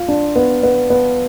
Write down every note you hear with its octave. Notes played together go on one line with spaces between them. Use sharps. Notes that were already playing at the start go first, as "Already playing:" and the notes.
Already playing: F4
D4
B3
B3
B3